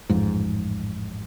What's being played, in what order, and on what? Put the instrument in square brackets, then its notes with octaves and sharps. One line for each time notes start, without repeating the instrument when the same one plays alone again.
[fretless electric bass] A1 F2 G#2